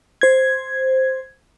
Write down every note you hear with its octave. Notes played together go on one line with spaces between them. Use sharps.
C5 G#6